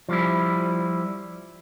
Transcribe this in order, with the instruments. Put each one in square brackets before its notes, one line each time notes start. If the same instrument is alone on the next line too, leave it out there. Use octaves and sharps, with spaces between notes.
[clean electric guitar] F3 G3 E4